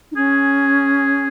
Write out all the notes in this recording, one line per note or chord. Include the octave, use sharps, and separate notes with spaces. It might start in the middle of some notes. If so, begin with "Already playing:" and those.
D#4
C#4 G#4